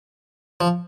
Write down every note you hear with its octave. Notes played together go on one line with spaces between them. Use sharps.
F3